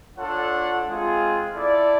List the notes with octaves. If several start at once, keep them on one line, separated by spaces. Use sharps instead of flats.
D4 F4 A4 C#5 F#5
G#3 C4 F4 G#4
E4 A4 D5